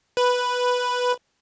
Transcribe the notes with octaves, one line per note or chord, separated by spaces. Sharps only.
B4